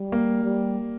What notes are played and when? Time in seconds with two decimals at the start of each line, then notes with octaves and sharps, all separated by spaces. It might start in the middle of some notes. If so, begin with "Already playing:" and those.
Already playing: G3
0.12 A#3
0.44 G3